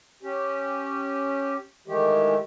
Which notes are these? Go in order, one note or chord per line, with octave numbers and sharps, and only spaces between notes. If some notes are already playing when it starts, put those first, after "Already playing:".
C#4 G4
D#3 E3 G#3 A3 G4